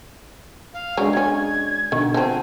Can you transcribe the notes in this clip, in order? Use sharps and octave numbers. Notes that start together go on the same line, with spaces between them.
F5
C#3 F#3 G#3 D4 D#5
F#3 C#4 G#6
B2 D3 D#3
F3 C4 F#5 G#5 A5